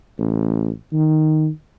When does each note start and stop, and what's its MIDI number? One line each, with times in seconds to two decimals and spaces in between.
0.19 0.70 33
0.93 1.49 51